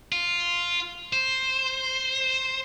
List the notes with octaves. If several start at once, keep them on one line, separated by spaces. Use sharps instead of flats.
F4
C5